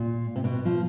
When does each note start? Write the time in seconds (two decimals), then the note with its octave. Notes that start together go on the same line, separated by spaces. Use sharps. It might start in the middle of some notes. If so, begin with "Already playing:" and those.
Already playing: A#2
0.36 C3
0.44 B2
0.65 F3